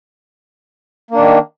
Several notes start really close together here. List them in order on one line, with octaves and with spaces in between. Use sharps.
A#3 D4 D#3